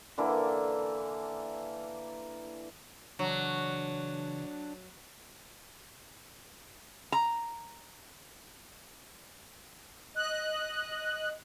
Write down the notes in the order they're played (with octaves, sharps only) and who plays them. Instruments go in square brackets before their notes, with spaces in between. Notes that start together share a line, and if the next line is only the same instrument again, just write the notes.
[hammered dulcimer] D3 E3 A#3 A4
[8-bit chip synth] C#3 E3 C#5 [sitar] F#3 [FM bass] D4
[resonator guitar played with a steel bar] A#5
[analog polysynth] D#5 F#6